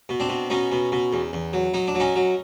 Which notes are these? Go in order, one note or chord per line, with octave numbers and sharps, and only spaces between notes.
B2
C4 D4
B2
B2 C#4 D#4
B2
B2
E2
E2
F#3
F#3 D#4
D4
F#3
C#4 D#4
F#3